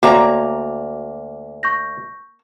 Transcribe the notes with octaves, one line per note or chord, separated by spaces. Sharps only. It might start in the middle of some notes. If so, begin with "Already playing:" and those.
D2 A#3 F#4 C#5 D5 A#5
C#6 G6 A#6